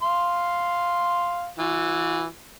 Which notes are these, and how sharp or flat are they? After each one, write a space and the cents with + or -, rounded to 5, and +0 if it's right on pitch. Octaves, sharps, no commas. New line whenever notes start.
F5 +0 C6 +0
E3 +0 F#4 -40